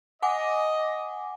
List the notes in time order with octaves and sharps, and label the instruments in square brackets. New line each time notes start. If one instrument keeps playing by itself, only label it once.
[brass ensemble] D#5 [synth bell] F#5 G#5 D6